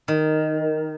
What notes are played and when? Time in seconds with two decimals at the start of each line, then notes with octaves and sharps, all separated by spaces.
0.08 D#3